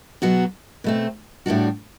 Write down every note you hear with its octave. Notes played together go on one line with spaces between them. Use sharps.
B2 F#3 B3 F#4
B2 A3 C4
A2 G3 D4 F#4